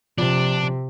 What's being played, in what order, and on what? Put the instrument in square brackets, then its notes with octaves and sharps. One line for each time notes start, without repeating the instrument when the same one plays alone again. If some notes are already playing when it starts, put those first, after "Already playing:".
[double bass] C3 [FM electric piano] F3 [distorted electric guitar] D4